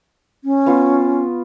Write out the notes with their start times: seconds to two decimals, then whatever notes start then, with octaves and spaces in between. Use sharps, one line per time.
0.44 C#4
0.66 B3 F4 C#6